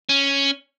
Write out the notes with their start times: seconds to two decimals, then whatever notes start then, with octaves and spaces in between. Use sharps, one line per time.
0.09 C#4